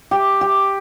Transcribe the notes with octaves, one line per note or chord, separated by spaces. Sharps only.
G4
G4